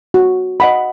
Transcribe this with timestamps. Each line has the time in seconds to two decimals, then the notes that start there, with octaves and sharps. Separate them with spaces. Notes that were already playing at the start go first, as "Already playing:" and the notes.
0.14 F#4
0.60 D#5 F#5 B5